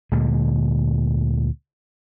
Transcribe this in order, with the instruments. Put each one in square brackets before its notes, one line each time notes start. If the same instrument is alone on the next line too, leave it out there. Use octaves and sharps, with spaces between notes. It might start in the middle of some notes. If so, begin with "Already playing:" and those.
[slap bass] D2 A#2 D3 G#3